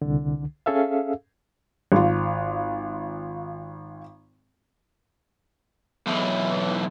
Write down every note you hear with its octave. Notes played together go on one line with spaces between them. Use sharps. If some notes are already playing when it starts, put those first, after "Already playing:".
C2 D3
C#4 G#4 A4 E5 F5
G#1 F4
B1 E3